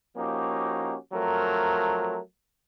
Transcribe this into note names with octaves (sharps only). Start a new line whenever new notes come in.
F3 A#3 C#4 D#4 F#4 G4
F3 F#3 A3 C4 A#4